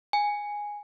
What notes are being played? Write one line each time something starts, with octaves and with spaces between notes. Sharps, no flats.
G#5